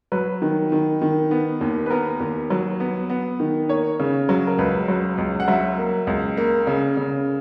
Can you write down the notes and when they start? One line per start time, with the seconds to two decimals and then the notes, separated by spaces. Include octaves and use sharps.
0.12 F#3 B4
0.42 D#3
0.72 D#3
1.02 D#3
1.31 B3
1.61 D#2
1.86 B4
1.90 B3 A#4
2.20 D#2
2.50 F#3
2.80 B3
3.10 B3
3.40 D#3
3.69 A#3 C#5
4.00 C#3
4.29 F#3
4.47 A#4
4.58 C#2 B4
4.88 F#3
5.18 C#2
5.40 F#5
5.48 F#3 E5
5.78 A#3
6.07 C#2
6.37 A#3
6.67 C#3
6.97 C#3